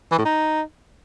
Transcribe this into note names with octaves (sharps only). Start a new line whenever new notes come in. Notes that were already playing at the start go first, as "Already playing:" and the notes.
E3
A2
D#4